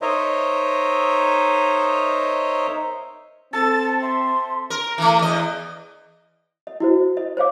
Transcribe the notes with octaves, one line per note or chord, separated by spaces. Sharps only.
D#4 A#4 C5 C#5 D#5 E5
C4 A4 A5 A6
E5 C6
A#4
E3 A3
E2 D#5
D#5
E4 F#4 C5
D#5
C5 C#5 F5 D6